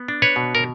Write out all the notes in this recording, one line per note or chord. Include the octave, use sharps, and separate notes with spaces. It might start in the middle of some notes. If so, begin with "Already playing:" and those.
Already playing: B3
D4
B4 C#5
B2
A#4